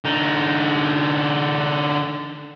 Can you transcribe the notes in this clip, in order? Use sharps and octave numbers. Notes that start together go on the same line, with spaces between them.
D3 D#4